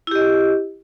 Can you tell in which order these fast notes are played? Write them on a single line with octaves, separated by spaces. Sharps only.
E4 G4 D#5